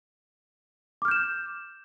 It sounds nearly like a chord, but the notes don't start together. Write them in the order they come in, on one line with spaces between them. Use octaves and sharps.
D6 F6 G6 E7